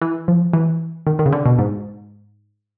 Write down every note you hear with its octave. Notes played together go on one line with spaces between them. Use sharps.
E3
F3
E3
D#3
D#3
C#3
D3
B2
G#2